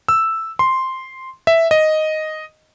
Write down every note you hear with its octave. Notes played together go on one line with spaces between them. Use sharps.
E6
C6
E5
D#5